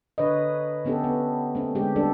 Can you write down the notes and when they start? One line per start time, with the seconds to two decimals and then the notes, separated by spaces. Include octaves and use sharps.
0.18 D3 B4 C#5 D#5
0.85 D3 B3 C#4 G4 A4
1.04 B3
1.55 A3 C4 C#4
1.75 D3 G#3 G4
1.95 G3 A3 D4 A4